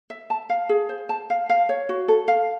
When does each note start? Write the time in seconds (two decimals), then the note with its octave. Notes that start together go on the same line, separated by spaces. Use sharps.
0.10 E5
0.30 A5
0.50 F5
0.69 G#4
0.89 C5
1.09 A5
1.30 F5
1.49 F5
1.69 C#5
1.89 F#4
2.08 A4
2.28 F5